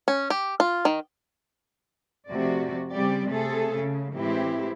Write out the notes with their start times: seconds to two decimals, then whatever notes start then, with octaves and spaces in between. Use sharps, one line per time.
0.08 C#4
0.30 G4
0.60 F4
0.85 D#3
2.29 F2 C3 F3 A3 F#4 D5
2.92 C#3 G3 C4 G4 D5
3.28 C3 A3 G#4 A4
3.76 C#3
4.14 A2 E3 G#3 C4 E4 G4